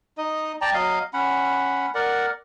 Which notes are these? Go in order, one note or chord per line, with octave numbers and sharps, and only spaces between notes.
D#4 D#5
D5 G5 A5 A#5
F#3 D#5 F5
C#4 F#5 B5
A#4 D5 F#5